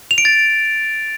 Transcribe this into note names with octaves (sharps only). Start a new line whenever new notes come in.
F7
D7
A6